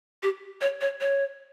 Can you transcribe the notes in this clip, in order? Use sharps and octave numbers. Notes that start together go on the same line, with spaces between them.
G4
C#5
C#5
C#5